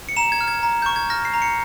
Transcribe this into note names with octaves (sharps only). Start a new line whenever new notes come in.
C#7
A#5 E7
G#6
F6
G#6
A#5
C#6 G6
G#6
F6 A#6
C7
A#5
C#7